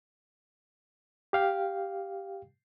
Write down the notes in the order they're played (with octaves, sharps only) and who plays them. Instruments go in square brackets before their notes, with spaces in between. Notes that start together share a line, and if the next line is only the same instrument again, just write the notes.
[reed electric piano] G4 F5 G5